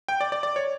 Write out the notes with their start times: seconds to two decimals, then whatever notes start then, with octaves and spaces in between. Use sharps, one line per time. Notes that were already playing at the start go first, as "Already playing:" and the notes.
0.08 G5
0.21 D5
0.32 D5
0.43 D5
0.56 C#5